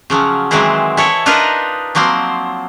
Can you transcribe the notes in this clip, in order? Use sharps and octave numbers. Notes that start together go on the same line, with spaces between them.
C#3 F3 F#3
D#3 E3 F#3 G#3 C4 E4
E4 A4 C#5
D4 D#4 F4 A#4 B4 D#5
F3 F#3 A#3 C4 C5